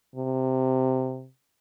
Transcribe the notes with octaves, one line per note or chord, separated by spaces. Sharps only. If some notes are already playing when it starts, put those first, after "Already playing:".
C3